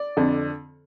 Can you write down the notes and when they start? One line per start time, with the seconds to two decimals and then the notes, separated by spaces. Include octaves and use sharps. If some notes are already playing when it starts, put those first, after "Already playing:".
Already playing: D5
0.17 F2 D3